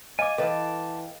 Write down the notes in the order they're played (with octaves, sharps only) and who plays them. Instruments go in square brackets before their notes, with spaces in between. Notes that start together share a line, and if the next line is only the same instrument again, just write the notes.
[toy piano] D#5 D6 [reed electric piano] F5 [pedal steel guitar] G#5
[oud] E3 B4 [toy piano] A4 D#5 [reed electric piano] F5 G5 [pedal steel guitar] A5 D6